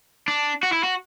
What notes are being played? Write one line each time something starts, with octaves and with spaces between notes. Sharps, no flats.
D4
F#4
E4
F#4